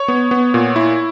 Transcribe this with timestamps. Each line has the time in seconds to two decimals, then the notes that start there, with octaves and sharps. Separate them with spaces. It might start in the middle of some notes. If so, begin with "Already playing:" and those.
Already playing: C#5 C#6
0.08 B3
0.31 B3
0.54 A#2
0.76 E4